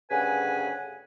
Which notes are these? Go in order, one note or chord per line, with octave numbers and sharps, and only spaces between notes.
D2 G2 C#3 B4 F#5 G#5